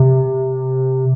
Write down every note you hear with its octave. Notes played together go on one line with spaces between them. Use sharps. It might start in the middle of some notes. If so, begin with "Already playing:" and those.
Already playing: C3